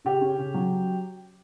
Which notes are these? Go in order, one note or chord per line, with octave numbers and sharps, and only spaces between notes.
C#3 G4
C#4
C#3
F#3